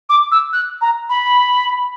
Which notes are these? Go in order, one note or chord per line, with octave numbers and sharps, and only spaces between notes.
D6
E6
F#6
A#5
B5